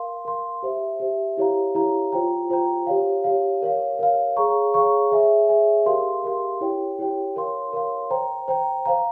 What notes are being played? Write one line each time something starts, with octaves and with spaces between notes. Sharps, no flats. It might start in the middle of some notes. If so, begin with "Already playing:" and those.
Already playing: A#4 F5 C6
A#4 F5 C6
G4 C5 E5
G4 C5 E5
E4 G4 C#5 F5 A#5
E4 G4 C#5 F5 A#5
F4 C5 G5 A#5
F4 C5 G5 A#5
G4 C#5 F5
G4 C#5 F5
A#4 C#5 F5
A#4 C#5 F5
G#4 C#5 F5 A#5 C#6
G#4 C#5 F5 A#5 C#6
G#4 C#5 E5 G#5
G#4 C#5 E5 G#5
G4 A#4 F5 C6
G4 A#4 F5 C6
E4 G4 C#5 G5
E4 G4 C#5 G5
A#4 C#5 F5 C6
A#4 C#5 F5 C6
C5 G5 A#5
C5 G5 A#5
C5 F5 A#5